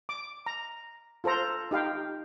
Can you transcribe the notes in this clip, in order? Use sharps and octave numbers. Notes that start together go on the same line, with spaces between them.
D6
A#5
F4 A4 C5 A#5
D#4 G4 F5 G5